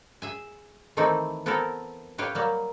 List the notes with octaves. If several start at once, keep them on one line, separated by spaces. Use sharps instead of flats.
G#4 E5 G#5
D#3 E3 A3 C4 D#4 E4
B3 C4 E4 A4 A#4
A2 G4 B4 C#5 F5
F#3 G3 A#3